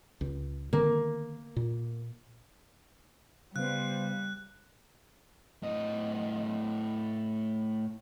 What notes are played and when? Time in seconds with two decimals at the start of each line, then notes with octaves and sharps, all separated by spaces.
0.21 C#2
0.73 D3 D#3 A#3 C4
1.56 A#2
3.56 C#3 G3 B3 C5 F5 F#6
5.63 A2 D#5